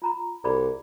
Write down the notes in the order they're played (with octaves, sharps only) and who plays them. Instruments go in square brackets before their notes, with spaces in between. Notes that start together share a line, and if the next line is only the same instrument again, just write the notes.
[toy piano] F4 A#5 B5
[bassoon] C2 [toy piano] G#4 D5 B5